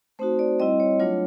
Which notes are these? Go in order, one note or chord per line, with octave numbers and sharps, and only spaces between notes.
A3 C4 D#4 F#4 C5
D5
G3 C4 E4 D#5
C#5
F#3 A3 D4 F4 C#5